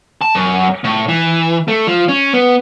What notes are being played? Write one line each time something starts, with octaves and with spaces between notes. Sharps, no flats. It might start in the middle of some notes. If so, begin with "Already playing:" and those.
A5
F#2
A2
E3
A3
F3
C#4
B3